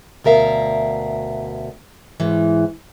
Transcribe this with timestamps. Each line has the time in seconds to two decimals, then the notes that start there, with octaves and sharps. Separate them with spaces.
0.24 D2 B2 A#4 E5 F5
2.20 G#2 E3